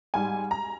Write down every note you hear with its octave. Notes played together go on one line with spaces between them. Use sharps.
G#2 G3 G#5
A#5